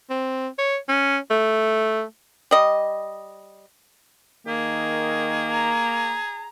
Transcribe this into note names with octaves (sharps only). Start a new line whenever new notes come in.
C4
C#5
C#4
A3
G3 D#5
D#3 A#3 G#4
A#5